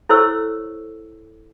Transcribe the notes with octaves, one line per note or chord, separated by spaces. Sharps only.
E4 A4 C5 C#5 C#6 E6